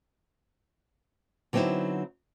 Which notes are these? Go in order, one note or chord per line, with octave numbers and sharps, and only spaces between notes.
D3 F#3 B3 C4 D#4 E4